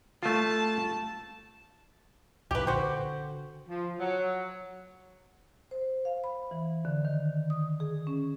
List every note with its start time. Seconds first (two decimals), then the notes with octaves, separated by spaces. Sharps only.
0.23 A3 F4 A5
2.51 A#1 A2 C3 G4 B4
2.67 D3 F#4 C5
3.69 F3
3.99 F#3
5.71 C5
6.05 F5
6.24 B5
6.51 E3
6.85 D3
7.05 D#3
7.50 D#6
7.80 G#4
8.07 C#4